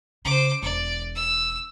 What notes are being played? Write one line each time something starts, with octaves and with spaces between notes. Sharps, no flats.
C#3 C5 D6
E1 D5
E6